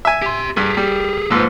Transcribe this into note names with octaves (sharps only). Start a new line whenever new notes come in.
E5 G#5
G4 C6
G2 G4 G#4
G3
G#2 F3 A#3 B4 E6